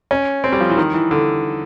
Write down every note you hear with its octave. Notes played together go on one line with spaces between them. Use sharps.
C#4
C4
G3
F3
E3
D#3
E3
D3